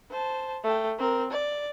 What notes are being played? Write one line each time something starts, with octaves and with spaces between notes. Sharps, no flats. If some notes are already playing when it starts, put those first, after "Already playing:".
C5 A5
A3 G5
C4 A#4
D5